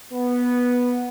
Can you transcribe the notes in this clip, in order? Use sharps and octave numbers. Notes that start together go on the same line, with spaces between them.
B3